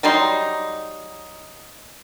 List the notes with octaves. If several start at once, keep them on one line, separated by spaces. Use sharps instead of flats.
F#3 G3 D#4 C6